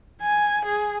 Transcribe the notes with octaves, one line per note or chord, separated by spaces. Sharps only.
G#5
G#4